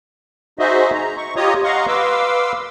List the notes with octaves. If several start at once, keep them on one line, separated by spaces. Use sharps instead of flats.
D#4 F#4 G#4 C5 D#5 E5
A#5
C#6
F4 G4 C#5 D#5 A#5 D#6
D#5 F5 F#5 A#5 C6 C#6
B4 F5 C6 D6 E6